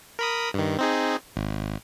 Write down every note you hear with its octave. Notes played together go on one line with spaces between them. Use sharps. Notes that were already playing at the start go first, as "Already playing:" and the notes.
A#4 B5 D#6
G2 D#3
C4 D#4 G#4
G#1